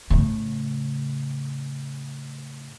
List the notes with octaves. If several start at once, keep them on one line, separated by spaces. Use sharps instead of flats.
A2 C#3